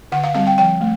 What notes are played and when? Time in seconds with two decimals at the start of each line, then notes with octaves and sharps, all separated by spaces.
0.12 D3 F#5
0.24 F5
0.35 G3 C4 F5
0.47 G5
0.58 F3 G5
0.81 A3